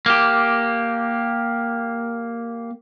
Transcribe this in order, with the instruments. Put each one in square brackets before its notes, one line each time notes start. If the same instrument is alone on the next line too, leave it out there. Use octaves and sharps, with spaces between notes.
[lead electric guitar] A#3 G4